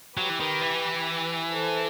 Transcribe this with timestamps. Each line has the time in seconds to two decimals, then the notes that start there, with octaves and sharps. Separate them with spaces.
0.17 F#3 G4 B4
0.29 E3
0.40 D#3
0.61 E3
1.51 A4 C5